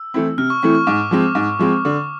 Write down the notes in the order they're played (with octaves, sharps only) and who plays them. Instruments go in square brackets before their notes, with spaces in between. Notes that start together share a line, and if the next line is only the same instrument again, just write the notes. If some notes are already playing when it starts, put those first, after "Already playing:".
Already playing: [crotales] E6
[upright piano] E3 A3 C4 E4
[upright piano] C3 [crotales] F6
[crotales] C#6
[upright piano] E3 A3 C4 E4 [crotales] C#6
[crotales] C#6
[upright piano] G#2 [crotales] D6
[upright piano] F3 G#3 C4
G#2
F3 G#3 C4
D3